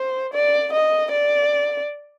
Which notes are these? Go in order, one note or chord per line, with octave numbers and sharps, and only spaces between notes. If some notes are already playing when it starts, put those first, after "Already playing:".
Already playing: C5
D5
D#5
D5